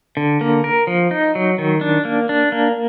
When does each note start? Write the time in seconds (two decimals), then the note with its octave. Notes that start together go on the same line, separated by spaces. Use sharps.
0.17 D3
0.41 A#3
0.64 A#4
0.87 F3
1.11 D#4
1.35 F#3
1.58 D#3
1.81 D4
2.05 A#3
2.29 D4
2.52 A#3